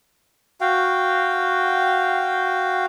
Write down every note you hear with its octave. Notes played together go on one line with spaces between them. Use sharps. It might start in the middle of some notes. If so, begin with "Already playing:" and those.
F#4 F5 G5